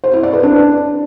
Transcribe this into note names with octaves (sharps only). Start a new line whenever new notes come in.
C5
E4
D5
B4
D4